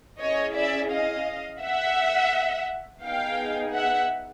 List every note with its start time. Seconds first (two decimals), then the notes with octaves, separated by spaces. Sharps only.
0.21 C#4 E4 G#4 C#5 D#5
0.56 D5 E5
0.91 D#5 F5
1.62 E5 F#5
3.03 B3 D#4 G#4 F5 G5
3.74 E5 F#5